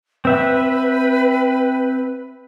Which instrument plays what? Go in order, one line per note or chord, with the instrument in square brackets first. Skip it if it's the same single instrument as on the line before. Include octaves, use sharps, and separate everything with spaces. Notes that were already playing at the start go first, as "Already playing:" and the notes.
[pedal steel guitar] C4 E5 F#5 [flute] B4